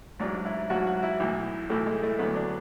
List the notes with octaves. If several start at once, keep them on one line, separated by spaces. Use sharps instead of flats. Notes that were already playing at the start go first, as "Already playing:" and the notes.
A1 G#2 F#3 D4
E4
A1 G#2 F#3 F#4
F#4
E4
B1 A2 E3
B1 A2 E3 A3
G#3
A3
D2 D3 F#3 B3
D4